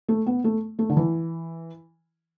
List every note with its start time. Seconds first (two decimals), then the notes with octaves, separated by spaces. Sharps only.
0.09 A3
0.26 B3
0.44 A3
0.79 A3
0.90 D3
0.97 E3